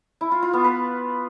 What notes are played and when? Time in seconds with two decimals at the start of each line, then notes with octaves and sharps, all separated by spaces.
0.21 E4
0.32 F4
0.43 F4
0.53 B3
0.64 B4